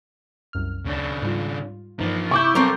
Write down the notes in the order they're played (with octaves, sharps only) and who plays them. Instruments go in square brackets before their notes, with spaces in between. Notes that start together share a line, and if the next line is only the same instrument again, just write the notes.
[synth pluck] C2 F#2 F6
[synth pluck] D2 [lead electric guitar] C#3 D4
[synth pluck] G#2 G3 F4
[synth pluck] G2 E3 D#4 [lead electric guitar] F3 A#3
[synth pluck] C3 [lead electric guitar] E4 [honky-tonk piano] C#6 D6 G6
[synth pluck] F#3 G3 [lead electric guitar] B3 A4 [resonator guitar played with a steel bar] C4 A#4